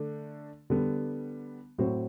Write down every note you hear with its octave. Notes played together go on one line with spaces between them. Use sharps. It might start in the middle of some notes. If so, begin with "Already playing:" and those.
Already playing: D3 A3 D4
D3 G3 B3
A2 F#3 C4 F#4 C5